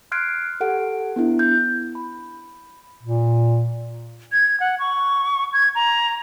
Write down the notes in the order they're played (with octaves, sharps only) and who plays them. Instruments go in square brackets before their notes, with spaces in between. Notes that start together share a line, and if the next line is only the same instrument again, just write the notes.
[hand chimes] C6 F6 F#6 G#6 C7 D7
G4 A4 F#5 D7
B3 D4 E4
G6
B5
[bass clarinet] A#2
[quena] G#6
F#5
C#6
G#6
A#5